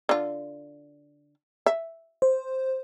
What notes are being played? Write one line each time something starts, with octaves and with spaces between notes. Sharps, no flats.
D3 F4
E5
C5